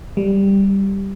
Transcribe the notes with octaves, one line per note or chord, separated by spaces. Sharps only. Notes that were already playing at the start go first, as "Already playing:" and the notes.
G3